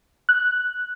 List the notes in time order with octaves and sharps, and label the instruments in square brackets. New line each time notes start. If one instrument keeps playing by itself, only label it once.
[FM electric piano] F#6